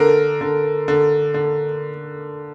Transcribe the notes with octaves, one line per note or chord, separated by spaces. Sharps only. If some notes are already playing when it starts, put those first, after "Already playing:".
Already playing: D3 A#4
D3
D3
D3